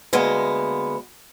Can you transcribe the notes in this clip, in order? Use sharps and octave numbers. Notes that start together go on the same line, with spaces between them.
D2 G#3 A#3 B3